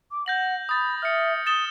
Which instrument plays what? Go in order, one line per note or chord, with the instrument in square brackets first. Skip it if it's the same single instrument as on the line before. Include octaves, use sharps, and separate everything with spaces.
[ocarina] D6
[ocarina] F#5 [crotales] G6 A#6 F#7
[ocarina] B5 [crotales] D#6 A6
[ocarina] E5 [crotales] F6 C#7
[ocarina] D#6 [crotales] A6 E7 G7